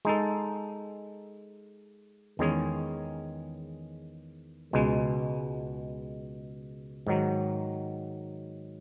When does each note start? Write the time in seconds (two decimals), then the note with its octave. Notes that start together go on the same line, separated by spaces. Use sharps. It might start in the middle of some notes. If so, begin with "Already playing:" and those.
0.05 G#3 D#4 A4
2.39 E2 D#3 G#3 C#4 G#4
4.73 C#2 B2 G#3
7.07 G#2 D#3 F#3